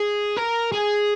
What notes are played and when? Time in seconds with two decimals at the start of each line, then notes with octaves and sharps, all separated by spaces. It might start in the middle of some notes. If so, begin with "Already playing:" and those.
Already playing: G#4
0.36 A#4
0.72 G#4